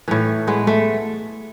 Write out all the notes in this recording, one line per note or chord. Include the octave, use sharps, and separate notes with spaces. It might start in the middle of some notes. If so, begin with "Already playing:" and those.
A2 E3 A3
G#3 B3
A3